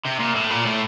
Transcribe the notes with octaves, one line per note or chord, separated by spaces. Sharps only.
C3
A#2
A2
A#2
A2